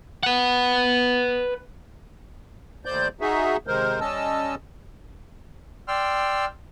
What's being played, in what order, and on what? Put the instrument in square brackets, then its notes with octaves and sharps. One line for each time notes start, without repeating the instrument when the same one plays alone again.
[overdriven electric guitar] B4 F#5
[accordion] D#2 A2 C5 D5 G6
D#4 F#4 G#4 E5
C3 D#3 G#3 A#4 C5
G3 C#4 D#5 A5 E6
[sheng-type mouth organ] D5 G5 C6 E6 F6